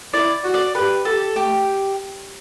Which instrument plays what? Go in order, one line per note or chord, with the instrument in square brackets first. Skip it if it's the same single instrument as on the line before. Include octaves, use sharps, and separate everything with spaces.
[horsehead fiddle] E4 [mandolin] D5
[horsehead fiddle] F#4
[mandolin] D5
[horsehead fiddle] G4 [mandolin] B4
[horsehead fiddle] G4 [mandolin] A4
[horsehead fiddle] A3 [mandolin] G4